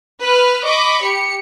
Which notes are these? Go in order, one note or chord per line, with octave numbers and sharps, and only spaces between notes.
B4 F6
D#5 B5 C#6 D6
G4 C#7